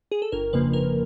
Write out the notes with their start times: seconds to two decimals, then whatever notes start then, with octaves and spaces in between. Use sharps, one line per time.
0.11 G#4
0.22 A4
0.32 G1 A#4
0.53 F2 C#3 F3 A#3 B4
0.73 G1 A#4